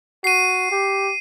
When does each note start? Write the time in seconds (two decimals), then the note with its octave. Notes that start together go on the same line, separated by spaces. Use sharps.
0.24 F#4 C7 D#7
0.72 G4